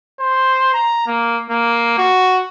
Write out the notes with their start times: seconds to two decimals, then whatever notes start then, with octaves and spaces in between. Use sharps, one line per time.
0.20 C5
0.74 A#5
1.07 A#3
1.50 A#3
1.98 F#4